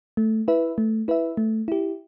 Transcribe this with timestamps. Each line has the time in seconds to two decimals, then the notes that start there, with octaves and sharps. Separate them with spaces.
0.17 A3
0.48 E4 B4 E5
0.78 A3
1.08 E4 B4 E5
1.37 A3
1.68 E4 G4